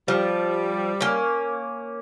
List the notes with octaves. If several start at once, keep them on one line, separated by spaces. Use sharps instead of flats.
F3 G3
A#3 C#4